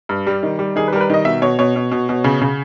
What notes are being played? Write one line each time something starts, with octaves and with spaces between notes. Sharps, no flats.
G2
G3
D#3
G3
D#3 G#4
B4
G3 A#4
B4
D#3 D#5
B2 E5
B2 C#5
B2 C#5
B2
B2
B2
C#3
C#3